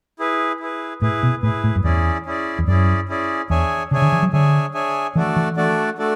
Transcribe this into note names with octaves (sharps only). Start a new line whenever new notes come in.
E4 G#4 B4
E4 G#4 B4
A2 E4 G#4 B4
B2
A2 E4 G#4 B4
A2
F#2
E2 C#4 E4 G#4 D5
C#4 E4 G#4 D5
E2
F#2 C#4 E4 G#4 D5
C#4 E4 G#4 D5
E2 D4 G#4 C#5 E5 G#5
C#3 D4 G#4 C#5 E5 G#5
D3
E3
F#3
D3 D4 G#4 C#5 E5 G#5
D4 G#4 C#5 E5 G#5
E3 A3 D4 F#4 A4 D5
E3
A3 D4 F#4 A4 D5
A3 D4 F#4 A4 D5